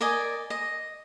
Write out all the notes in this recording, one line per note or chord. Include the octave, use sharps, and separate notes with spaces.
A#4 D5 D#5 G#5
D#5